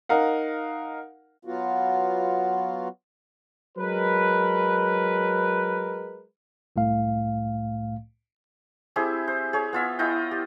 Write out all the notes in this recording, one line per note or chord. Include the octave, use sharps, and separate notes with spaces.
D#4 A#4 F5 F#5
F#3 B3 F4 F#4
F#3 G#3 A#4 B4
C2 A2 A3 F5
C4 E4 G4 G#4
C5
G#4 C#5
B3 F4 E5
E4 F4 D#5 G5
G4